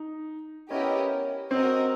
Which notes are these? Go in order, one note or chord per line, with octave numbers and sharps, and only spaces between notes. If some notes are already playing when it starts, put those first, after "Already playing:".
Already playing: D#4
B3 C#4 E4 G4 A#4 D#5
C4 F#4 A#4 D#5